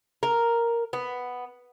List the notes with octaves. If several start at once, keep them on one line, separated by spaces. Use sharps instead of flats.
A#4
B3